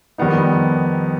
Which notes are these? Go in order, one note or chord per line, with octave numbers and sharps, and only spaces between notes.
F2 D#3 G3 B3 D#4